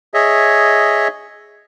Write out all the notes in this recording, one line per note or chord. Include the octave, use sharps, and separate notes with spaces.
G#4 C#5 D#5 E5